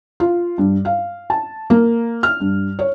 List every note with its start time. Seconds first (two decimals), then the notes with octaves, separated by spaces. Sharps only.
0.20 F4
0.58 G2
0.85 F5
1.30 A5
1.70 A#3
2.23 F6
2.40 G2
2.79 C#5